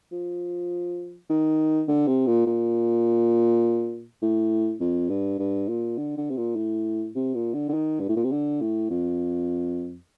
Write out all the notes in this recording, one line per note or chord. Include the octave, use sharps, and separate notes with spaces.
F3
D#3
D3
C3
A#2
A#2
A2
F2
G2
G2
A#2
D3
D3
C3
A#2
A2
C3
A#2
D3
D3
D#3
G2
A2
A#2
C3
D3
A2
F2